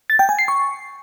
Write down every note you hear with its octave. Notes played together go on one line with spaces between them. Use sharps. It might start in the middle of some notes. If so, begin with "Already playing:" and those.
A6
G5
G#5
C7
C#6